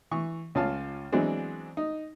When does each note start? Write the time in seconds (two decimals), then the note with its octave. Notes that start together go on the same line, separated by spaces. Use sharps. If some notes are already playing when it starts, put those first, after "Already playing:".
0.11 E3 C#6
0.55 C#2 C#4 F4 F5 A5
1.12 E3 F#3 G#3 B3 C4 D4
1.77 D#4